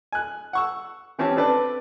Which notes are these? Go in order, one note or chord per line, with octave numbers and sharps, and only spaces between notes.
G#5 F#6
F#5 C#6 E6
E3 C4 C#4 G4 A5
C4 D4 A4 B4 D5